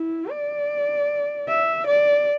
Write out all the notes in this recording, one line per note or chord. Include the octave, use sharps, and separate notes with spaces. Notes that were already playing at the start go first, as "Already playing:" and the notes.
Already playing: E4
D5
E5
D5